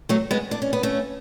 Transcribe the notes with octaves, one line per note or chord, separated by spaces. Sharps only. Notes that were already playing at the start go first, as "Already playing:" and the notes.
F#3 A3
G#3 B3
D4
C#4
B3
A3 C#4